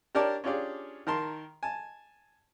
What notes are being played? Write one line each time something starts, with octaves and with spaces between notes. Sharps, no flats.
D4 G4 A#4 C#5 D5 A5
C#4 D4 F4 G4 G#4 D5
D#3 A#4 A5 C6
G#5 A5